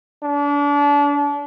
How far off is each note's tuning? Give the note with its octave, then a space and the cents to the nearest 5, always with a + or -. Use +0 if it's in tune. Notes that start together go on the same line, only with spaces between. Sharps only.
D4 -35